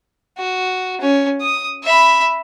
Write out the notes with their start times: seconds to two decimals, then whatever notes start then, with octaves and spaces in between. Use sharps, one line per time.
0.38 F#4
1.01 C#4
1.41 D#6
1.83 E5 B5